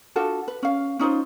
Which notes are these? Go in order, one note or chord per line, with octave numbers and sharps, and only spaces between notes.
D4 F4 F#4 A4
B4
C#4 F5
C#4 D#4 F4 C5